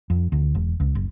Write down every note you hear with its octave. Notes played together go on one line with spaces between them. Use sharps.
F2
D2
E1
C#2
F#1